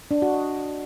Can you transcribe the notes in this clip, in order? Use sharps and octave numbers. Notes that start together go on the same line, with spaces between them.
D4
F#4
D#5